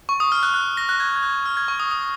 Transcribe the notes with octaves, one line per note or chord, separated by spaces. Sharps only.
C#6
D#6
F6
F#6
F#6
A#6
F#6
G#6
G#6
F#6
F6
G#6
C#6
D#6
D#6